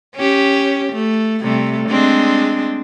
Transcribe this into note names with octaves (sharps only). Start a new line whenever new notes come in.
C#4 G4
A3
C3 G3 A3
G#3 C4 D4